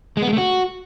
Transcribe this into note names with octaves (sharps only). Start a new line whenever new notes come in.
G#3
B3
G#3
A3
F#4